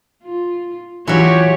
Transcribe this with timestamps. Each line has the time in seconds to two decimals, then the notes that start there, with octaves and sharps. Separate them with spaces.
0.24 F4
1.07 E3 F#3 F4 G4 C#5